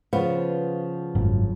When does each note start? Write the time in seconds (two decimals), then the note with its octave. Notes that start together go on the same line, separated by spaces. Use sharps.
0.13 C#3 F3 B3
1.15 G#1 F#2